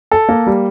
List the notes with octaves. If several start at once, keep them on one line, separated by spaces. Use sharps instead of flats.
A4
A#3
G3